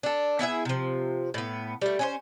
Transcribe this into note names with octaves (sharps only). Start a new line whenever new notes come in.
D4 A4
B3 E4 G#4 E5
C3 F3
A2 B3
G3 A3
C#4 D4 C5